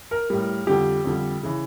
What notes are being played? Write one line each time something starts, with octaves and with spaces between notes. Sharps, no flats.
A#4
A2 G3
F2 D3 G3 G4
F2 D3 G3
C#3 E3